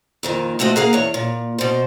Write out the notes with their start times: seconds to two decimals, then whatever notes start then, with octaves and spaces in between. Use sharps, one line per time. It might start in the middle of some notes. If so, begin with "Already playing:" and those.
0.23 F2 A#2 D#3
0.59 F3 A3 C4 F#4 D#5
0.76 A#3 G#4 F5 F#5
0.93 E2 C#5
1.14 A#2
1.58 B2 C5